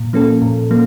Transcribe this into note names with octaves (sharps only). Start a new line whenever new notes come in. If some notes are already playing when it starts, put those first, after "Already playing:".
Already playing: A#2
F3 A#3 C#4 A4
A#2
F3 A#3